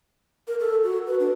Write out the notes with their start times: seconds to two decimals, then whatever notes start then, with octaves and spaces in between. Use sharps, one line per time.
0.47 A#4
0.60 A4
0.84 F#4
1.07 B4
1.20 D4